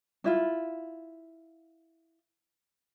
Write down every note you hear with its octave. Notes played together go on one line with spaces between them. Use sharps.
D4 E4 F4